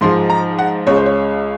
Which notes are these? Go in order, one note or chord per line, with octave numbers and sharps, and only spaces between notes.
G#2 F3 G#3 C6
A#5
F#5
C#2 C#3 G#3 C#5
C5
C#5